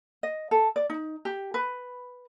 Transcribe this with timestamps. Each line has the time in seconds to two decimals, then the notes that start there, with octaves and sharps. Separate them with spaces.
0.23 D#5
0.51 A4
0.76 D5
0.90 D#4
1.25 G4
1.54 B4